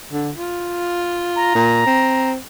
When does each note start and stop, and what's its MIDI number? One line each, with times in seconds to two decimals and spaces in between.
0.12 0.31 50
0.38 1.51 65
1.36 2.30 82
1.55 1.81 46
1.86 2.36 60